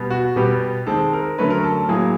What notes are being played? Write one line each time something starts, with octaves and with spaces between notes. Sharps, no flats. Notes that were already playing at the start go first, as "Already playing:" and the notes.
Already playing: B2 G3 B3
F#4
B2 G3 B3 G4
D#3 G#3 C4 A4
A#4
D3 F#3 A3 C#4 B4
A#4
A4
A4
A2 F#3 A#3 G#4